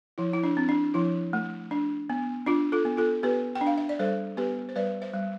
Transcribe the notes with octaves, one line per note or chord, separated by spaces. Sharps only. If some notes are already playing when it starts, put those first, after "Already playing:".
F3 E4
E4
D4
C4
D4
F3 E4
A3
D4
B3
D4 F4
F4 A4
B3
F4 A4
B3 G4 B4
G5
D4
F5
E5
D5
G3 A4 C5
B3 G4 B4
C5
G3 B4 D5
C5 E5
G3